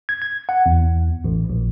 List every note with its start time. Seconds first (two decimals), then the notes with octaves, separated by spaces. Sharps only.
0.09 G#6
0.22 G#6
0.49 F#5
0.66 E2
1.24 A1
1.50 A#1